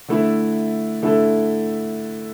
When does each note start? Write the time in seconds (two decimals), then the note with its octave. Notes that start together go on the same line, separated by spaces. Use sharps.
0.08 D3 A3 E4 A4
1.02 D3 A3 E4 A4